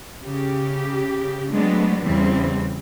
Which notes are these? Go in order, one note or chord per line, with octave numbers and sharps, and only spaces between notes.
C#3 G4
F#3 G#3 A3 B3 C4 D4
E2 C#3 E3 G3 C4